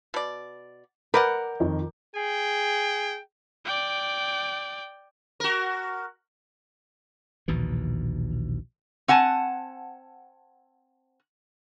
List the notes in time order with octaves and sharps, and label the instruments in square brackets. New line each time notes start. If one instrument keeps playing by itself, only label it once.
[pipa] B2 D5
[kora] A#4 [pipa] B4 D5 F#5 [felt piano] D6 G6
[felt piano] F2 D#3
[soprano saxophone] G#4 [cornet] G5
[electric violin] D5 G5
[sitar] F#4 A#4
[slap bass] A#1 D#2 B2 E3
[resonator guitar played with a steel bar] C4 F#5 G#5 A5